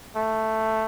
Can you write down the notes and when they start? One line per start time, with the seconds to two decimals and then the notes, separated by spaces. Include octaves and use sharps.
0.16 A3